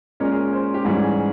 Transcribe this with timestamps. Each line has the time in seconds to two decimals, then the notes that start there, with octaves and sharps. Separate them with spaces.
0.20 A#2 G#3 C#4 A#4
0.31 G#4
0.53 C5
0.74 G4
0.85 G#2 E3 G3 C#4 G#4